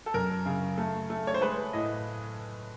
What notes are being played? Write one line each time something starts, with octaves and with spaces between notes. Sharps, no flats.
A4
F#2 A#4
C#3
A3
A3
C#5
C5
G#3 B4
A2 D#5